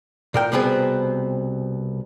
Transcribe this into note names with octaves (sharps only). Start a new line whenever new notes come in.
A#2 A#4 G5
C2 B2 B3 C4 G#4